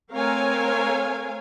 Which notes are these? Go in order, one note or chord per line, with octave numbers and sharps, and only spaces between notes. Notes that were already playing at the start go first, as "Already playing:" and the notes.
A3 C4 A#4 C#5 F5 G#5